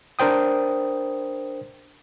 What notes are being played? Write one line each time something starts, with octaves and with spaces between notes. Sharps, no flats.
D4 A#4 C5 G5 D#6